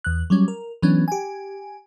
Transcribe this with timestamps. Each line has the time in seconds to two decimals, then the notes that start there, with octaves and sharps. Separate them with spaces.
0.04 E2 F#6
0.30 F#3 G3 C#4
0.48 A#4
0.82 E3 F#3 B3 C#4 D4
1.08 G4 G#5